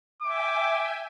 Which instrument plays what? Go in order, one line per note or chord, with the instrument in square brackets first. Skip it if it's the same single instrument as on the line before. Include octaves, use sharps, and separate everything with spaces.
[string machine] E5 G5 G#5 [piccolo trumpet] D6